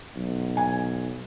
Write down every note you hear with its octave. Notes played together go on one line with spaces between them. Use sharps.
B1
G#5